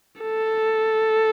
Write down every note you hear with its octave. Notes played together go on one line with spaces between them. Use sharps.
A4